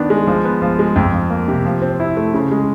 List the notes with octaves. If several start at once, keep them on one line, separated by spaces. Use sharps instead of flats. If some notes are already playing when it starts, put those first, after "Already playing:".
Already playing: D#3 B3 D4
G#3
F3
B3
F3
G#3
F2
F3
A#3
C3
F3
C4
E4
A3
C#3
G#3